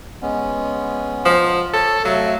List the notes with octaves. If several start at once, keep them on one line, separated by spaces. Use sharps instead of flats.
G#3 B3 C#4
F3
A4 C#5
C3 F#3 A3 F5